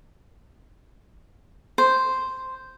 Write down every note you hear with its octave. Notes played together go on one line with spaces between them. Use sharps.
C5